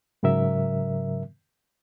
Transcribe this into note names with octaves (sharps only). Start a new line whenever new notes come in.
G#2 C#3 F#3 A#4 E5